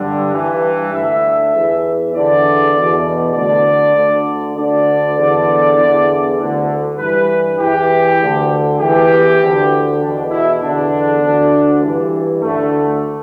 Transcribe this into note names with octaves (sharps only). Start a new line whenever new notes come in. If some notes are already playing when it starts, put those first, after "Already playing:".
Already playing: G2 D3
G2 E3
D2 D3 E5
E2 E3
E2 D3 D5
E2 B2
D2 D3 D5
D2 D3
D2 D3 D5
E2 D3
E2 D3
D2 D3
G2 E3 B4
E2 E3 G4
D2 D3
E2 E3 G4
D2 D3
E2 B2 D4
E4
E2 D3 D4
D2 D3
G2 E3
D2 D3 A3